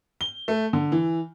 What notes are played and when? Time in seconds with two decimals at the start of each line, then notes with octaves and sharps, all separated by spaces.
0.21 G7
0.48 A3
0.73 D3
0.92 E3